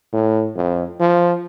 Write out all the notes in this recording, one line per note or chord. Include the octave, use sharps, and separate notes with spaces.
A2
F2
F3